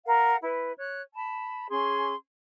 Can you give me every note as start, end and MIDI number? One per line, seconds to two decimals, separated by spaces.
0.05 0.37 70
0.05 0.37 77
0.05 0.37 78
0.42 0.71 64
0.42 0.71 71
0.78 1.02 73
0.78 1.02 90
1.15 1.69 81
1.15 1.69 83
1.70 2.13 61
1.70 2.13 68
1.70 2.13 84